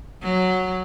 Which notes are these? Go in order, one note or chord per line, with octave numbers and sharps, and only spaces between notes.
F#3